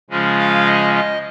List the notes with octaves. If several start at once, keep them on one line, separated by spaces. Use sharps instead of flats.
C#3 F3 G#3 C#4 F4
F5
D#5
D#5